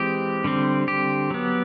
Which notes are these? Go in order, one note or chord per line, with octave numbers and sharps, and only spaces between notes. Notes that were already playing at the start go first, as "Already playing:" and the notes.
Already playing: E3 G#3 C4 G4
D3 G3 C4
G4
F#3 B3